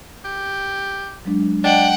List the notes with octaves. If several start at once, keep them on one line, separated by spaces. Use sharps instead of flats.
G4
F#3 G#3 D4
D4 D#5 F#5 G5 A5